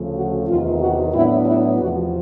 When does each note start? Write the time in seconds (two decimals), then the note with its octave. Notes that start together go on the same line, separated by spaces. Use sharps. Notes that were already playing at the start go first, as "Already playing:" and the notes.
Already playing: D2 C#3 F3 A3
0.15 F#4
0.47 E2 C3 D#3 F4
0.80 F#4
1.13 A2 F#3 B3 D4 E4
1.46 E4
1.79 E2 C3 F3 F#4